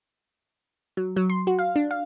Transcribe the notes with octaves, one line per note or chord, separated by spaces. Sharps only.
F#3
F#3
C6
F#4
F5
D4
F5